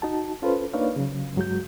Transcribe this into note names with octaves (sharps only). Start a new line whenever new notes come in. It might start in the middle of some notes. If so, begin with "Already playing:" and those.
D#4 F#4 A5
C#4 F4 A4 B4 C5
A#3 D4 D#4 B4 C#5 F5
C#3 F#3
G2 F#3 G#3 F#4 G6